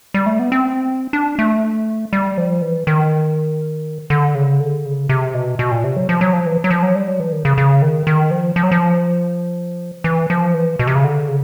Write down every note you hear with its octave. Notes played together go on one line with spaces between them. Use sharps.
G3
A3
B3
C4
D4
A3
G3
F3
E3
D#3
D3
C#3
D3
C#3
C3
B2
B2
A#2
C3
F#3
F3
F#3
F3
E3
F#3
F3
F#3
G3
F#3
E3
D#3
C#3
C#3
D#3
D#3
F3
F3
F#3
F3
E3
F3
E3
B2
C3
C#3
D3
C#3